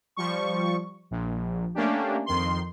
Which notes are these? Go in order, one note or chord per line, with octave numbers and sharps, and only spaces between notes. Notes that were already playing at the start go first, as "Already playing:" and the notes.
F3 G3 C#6
A#1
A3 A#3 C#4 D4 G4
F2 D#3 C6